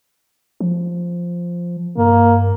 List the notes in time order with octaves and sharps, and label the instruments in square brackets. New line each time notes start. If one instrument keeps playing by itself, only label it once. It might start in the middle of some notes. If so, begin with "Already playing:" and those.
[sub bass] F3
[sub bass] G2 [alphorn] A#3